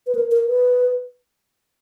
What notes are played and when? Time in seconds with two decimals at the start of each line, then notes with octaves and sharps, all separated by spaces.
0.07 B4
0.15 A#4
0.31 A#4
0.47 B4